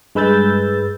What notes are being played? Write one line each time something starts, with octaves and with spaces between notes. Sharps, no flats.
G2 G#3 B4 E6 G6 A6